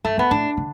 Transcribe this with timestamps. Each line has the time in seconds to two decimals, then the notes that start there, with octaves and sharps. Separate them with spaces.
0.04 G2 A3
0.17 E2 B3
0.31 A2 D4
0.57 D3